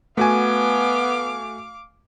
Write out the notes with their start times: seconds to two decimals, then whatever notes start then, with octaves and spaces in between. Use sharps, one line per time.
0.17 A3 B3 F#4 F5 G#5 D6